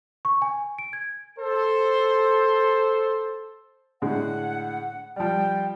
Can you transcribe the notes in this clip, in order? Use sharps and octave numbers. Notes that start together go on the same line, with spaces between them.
C#6
G#5
D7
G#6
A4 C5
A2 D3 G#3 F#5
F3 G3 G5